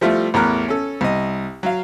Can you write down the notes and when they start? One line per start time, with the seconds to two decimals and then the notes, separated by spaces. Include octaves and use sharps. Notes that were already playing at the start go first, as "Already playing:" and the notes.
0.01 F3 G3 A3 E4 F4
0.34 A1 E2 A#4 A#5 F6 F#6
0.68 C#4 A4
1.01 C2 D#5
1.63 F#3 F5